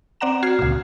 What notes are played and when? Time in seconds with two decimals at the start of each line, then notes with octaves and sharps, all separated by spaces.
0.21 C4 D5 F#5 A#5 E7
0.43 F#4 F6 G#6 C7
0.59 C#2 A#2